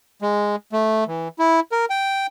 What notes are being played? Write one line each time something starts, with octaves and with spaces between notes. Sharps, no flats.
G#3
A3
E3
E4
A#4
G5